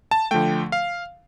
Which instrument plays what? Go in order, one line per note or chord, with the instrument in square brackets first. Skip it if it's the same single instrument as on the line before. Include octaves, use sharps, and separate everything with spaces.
[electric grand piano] A5
D3 F3 A3 G5
F5